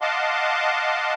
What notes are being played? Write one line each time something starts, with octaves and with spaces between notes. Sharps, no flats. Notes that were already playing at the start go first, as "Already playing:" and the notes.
D#5 F5 F#5 A5 C6 D6